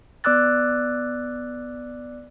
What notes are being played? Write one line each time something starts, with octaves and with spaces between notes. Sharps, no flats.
B3 D5 D6 E6 F#6 A6